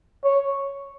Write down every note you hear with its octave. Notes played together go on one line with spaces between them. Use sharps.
C#5